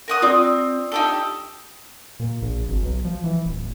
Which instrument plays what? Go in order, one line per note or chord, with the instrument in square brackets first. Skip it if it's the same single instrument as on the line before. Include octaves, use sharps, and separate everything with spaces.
[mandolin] A#4 F#5 D#6
[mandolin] C4 [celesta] F4 D5 D#6
[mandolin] D#4 G4 A4
[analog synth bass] A#2
A#1
G#1
B1
F3
E3
D1